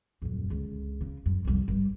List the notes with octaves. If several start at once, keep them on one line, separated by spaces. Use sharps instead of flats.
D#1 F#2
C#2 D3
C#3
F#2
C2 F2
G#1 G2